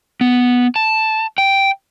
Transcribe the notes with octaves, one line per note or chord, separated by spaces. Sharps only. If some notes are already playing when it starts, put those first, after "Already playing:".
B3
A5
G5